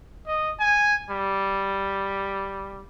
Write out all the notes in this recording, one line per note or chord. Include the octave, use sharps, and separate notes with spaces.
D#5
G#5
G3